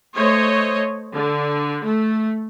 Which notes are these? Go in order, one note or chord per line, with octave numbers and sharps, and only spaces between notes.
A3 C5 C#5 D#5
D3
A3